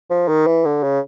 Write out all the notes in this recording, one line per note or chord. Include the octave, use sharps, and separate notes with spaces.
F3
D#3
E3
D3
C#3